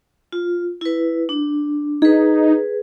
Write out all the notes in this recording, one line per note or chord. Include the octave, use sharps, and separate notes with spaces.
F4
E4 B4
D4
D#4 G#4 B4